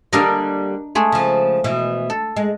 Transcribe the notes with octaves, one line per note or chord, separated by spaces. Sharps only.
D3 G3 A#3 D4 A#4 D#5
G#3 A3 G#4
C#3 F3
B2 E3
A4
G#3